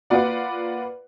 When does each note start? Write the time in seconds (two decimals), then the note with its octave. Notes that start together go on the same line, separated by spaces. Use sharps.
0.10 A#3 F4 B4 D5 F5 F#5